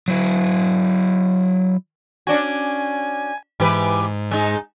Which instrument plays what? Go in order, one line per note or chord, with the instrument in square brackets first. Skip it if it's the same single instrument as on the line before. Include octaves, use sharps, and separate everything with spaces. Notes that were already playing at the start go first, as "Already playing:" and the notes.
[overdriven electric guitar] F#3 E4
[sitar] C#4 D4 F#4 [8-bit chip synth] G#5
[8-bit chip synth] G#2 [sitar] E3 G4 B4
[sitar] G#3 D#4